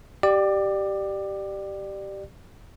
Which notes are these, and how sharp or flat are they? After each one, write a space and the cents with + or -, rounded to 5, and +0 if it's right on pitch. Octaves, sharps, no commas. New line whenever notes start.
G4 -10 D5 +20